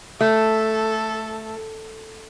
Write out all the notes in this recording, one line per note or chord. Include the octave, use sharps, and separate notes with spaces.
A3 A4